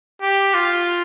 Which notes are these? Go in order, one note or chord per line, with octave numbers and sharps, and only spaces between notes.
G4
F4